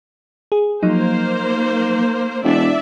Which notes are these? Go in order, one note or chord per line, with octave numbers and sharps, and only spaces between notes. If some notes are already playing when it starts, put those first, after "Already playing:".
G#4
F3 F#3 A#3 D#4 C5
E1 D4 D5 E5